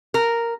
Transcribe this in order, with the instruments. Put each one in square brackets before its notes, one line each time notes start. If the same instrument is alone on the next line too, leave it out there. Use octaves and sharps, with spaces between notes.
[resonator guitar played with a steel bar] A#4